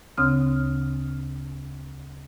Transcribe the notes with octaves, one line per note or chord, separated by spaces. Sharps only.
D2 C#3 C4 D#6 F6